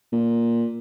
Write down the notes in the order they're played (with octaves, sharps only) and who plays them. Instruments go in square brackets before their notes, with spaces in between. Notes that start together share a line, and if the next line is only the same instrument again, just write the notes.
[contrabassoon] A#2